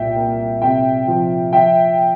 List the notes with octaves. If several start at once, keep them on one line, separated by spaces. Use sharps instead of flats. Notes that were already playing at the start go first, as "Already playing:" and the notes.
Already playing: C2 A#2 E5 G5
A#3
C3 E5 G5
F3
F3 E5 G5